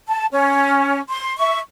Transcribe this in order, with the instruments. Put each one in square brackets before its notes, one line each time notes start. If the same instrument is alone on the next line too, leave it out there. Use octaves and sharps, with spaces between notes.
[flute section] A5
C#4
C6
E5 C#6